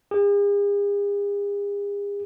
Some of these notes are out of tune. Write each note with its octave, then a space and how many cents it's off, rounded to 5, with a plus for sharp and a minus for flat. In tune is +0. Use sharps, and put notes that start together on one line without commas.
G#4 -45